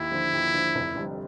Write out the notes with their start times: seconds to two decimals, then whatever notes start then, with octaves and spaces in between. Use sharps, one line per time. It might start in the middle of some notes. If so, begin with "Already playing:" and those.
Already playing: D#2 E4
0.11 D3 F3
0.33 D#2
0.54 D3 F3
0.75 F1
0.96 F2 D3 G3